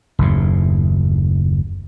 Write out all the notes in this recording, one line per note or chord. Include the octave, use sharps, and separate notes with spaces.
F#1 D#2 A2